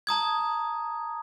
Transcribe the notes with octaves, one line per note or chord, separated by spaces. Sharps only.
A5 A#5 D#6 G#6